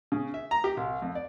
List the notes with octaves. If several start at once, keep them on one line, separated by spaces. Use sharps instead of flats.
C#3
E5
A#5
G4
C2
F2
D5